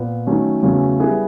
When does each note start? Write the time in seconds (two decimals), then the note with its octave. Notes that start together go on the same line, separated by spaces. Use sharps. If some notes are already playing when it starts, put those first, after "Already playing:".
Already playing: A#2 B3
0.27 D#3 F#3 A3 C#4
0.63 E2 C#3 F#3 A3 C#4
0.99 G3 B3 E4 G#4